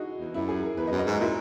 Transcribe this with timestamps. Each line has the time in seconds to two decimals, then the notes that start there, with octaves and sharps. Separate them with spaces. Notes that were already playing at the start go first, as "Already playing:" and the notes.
Already playing: D#4 E4 F#4 G#4
0.20 E2
0.34 F#2 E4
0.48 G#4
0.63 A#4
0.77 E2 B4
0.87 D#5
0.91 F#2
0.99 D#5
1.06 G#2 F#4
1.20 A#2 E4